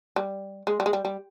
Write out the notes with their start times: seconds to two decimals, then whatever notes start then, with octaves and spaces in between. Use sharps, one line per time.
0.16 G3
0.67 G#3
0.80 G3
0.86 G#3
0.93 G3
1.05 G3